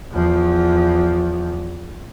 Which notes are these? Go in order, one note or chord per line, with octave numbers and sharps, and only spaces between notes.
E2 F3